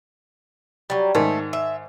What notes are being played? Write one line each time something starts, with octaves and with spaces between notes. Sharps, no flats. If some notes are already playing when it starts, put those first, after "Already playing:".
F#3 G3
G#2 D#3 A3
E5